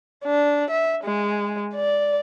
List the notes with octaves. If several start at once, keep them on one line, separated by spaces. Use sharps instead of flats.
D4
E5
G#3
D5